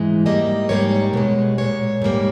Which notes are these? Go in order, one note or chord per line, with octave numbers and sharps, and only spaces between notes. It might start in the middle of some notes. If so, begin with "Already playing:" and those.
Already playing: G#2 E3 G#3
G#2 G3 A#3 D#5
G#2 G3 A#3 C#5
B2 G#3
A#2 G#3 C#5
G#2 G3 A#3